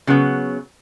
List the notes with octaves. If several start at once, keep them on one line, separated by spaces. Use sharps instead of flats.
C#3 F#3 B3